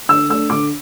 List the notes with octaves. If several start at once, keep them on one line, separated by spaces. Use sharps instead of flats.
D3 E6
A3 D4 E6
D3 D6